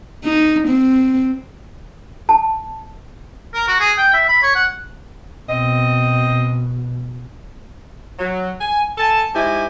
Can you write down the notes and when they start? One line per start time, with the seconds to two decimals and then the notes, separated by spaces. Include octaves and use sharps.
0.24 D#4
0.67 C4
2.29 A5
3.54 A#4
3.68 F#4
3.80 G#4
3.98 G5
4.13 E5
4.28 B5
4.43 C#5
4.55 F#5
5.49 B2 C4 D#5
8.19 F#3
8.61 G#5
8.98 A4 G#5 A5
9.34 G#2 G#3 E4 G4 G#5